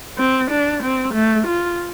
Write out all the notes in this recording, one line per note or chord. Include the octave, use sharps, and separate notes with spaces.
C4
D4
C4
A3
F4